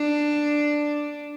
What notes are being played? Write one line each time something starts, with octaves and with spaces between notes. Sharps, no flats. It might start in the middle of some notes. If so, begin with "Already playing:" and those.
Already playing: D4